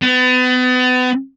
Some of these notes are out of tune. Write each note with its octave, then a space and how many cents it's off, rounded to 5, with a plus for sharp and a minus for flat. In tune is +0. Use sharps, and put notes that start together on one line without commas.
B3 +35